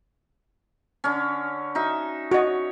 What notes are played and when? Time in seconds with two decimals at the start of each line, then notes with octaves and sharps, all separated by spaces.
1.04 D3 C#4
1.75 D#4 F#4 E5
2.31 F#4 C#5 D#5